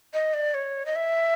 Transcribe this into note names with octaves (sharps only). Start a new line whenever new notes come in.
D#5
D5
C#5
D#5
E5